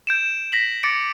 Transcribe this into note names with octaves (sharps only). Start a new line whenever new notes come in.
G6 D7 E7
A#6 B6 F#7
D6 A6 A#6 C#7 D7